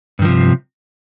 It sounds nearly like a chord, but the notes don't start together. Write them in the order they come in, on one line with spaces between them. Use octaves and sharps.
G2 D#3 F3 C3